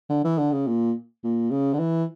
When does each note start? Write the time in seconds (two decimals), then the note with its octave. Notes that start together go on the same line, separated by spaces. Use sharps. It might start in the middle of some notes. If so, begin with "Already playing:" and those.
0.09 D3
0.24 E3
0.38 D3
0.52 C#3
0.67 A#2
1.24 A#2
1.51 C#3
1.74 D3
1.79 E3